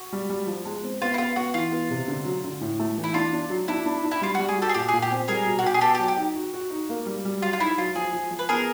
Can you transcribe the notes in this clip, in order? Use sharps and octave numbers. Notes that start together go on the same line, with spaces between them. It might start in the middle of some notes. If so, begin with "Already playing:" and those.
Already playing: F#4
G3
G3
F3
G#3
C4
B3 F4
E4
B3 F4
B3 F#4
E3 F4
B3
C3
D3
F#3
D3
A2
A3
E3
E4
D4 F4
D4
F#3
D4 E4
D4
D4
E4
G3 F4
F#4
G3
G#4
F#4 G4 A4
G#4
A#2 G4
G#4
A#2
G4
C4
G3 G#4 A#4
B2
F#4
B2 G4
G#4
B3 G4 A4
G4
F#3
G4
D#4
F#4
F#4
D#4
A#3
G3
G3
F#3 F4
F4
D#4 E4
F#3 F4
F3 G#4
F3
F3
B4
B3 G#4 A#4